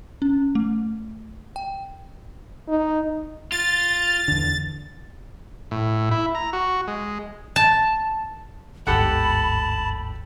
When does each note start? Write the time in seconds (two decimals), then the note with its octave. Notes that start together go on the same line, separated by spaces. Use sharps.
0.22 C#4
0.55 A3
1.56 G5
2.68 D#4
3.52 F4 A6
4.28 E2 D3
5.71 A2
6.11 E4
6.35 A#5
6.53 F#4
6.88 G#3
7.56 A5
8.87 G1 D2 G#2 G4 A4 F#5 A5 B5